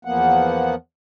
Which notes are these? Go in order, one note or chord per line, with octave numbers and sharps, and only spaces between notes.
E2 F3 A#3 B3 F#5